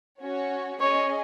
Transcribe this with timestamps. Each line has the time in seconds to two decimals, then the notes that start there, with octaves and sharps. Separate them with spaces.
0.21 C#4 F#4 C#5
0.80 C#4 G#4 C#5 D#5 G#5